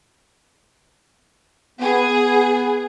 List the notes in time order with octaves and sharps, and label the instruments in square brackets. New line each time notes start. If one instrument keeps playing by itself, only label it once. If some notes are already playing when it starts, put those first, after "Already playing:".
[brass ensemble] B3 [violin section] G#4